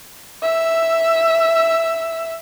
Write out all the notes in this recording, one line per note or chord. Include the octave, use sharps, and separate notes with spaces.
E5 E6